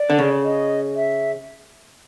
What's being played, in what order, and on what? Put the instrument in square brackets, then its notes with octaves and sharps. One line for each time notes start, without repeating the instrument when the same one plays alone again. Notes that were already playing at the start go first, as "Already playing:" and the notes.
Already playing: [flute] D5
[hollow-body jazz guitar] D3
C#3
[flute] D#5
E5